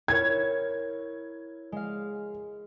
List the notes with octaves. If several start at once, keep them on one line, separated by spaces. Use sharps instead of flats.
E4 A#4 C#5 G#6
G#3 F5